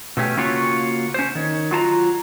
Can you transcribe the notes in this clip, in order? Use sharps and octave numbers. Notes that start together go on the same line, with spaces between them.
B2 A3 C#4 G4
C#3 A#3 C#4 F4 F#4 C#5
C#4 C5
D#3 C#5
F#3 F4 A5 A#5